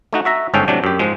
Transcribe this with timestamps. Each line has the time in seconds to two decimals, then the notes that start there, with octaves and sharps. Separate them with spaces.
0.13 A3 D#4 F#4
0.25 F#4 E5 A#5
0.54 G1 G#2 C#4 A4 G5
0.68 A2 C3 F#3 D4
0.84 F#2 G4
0.99 G#2 F3 G#3